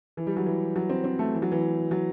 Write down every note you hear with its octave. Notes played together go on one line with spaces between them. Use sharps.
E3
G3
F#3
E3
F#3
C4
C4
A3
E3
F#3
E3
F#3